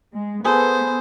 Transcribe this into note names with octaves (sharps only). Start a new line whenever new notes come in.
G#3
B3 G#4 A4 B4 C5